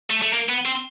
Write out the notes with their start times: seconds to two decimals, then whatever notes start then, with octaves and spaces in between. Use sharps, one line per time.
0.10 A3
0.23 A3
0.34 A#3
0.49 B3
0.66 C4